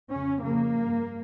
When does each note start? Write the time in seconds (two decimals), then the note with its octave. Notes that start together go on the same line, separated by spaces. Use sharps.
0.10 F2 C#3 C#4
0.42 F2 C#3 A#3
0.74 G2